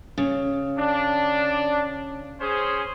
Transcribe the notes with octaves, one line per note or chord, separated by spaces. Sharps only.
C#3
D4
C#4 G#4 C5